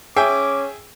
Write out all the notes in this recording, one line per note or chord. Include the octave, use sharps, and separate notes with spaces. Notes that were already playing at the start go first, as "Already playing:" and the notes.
C#4 G#4 E5 G5 D6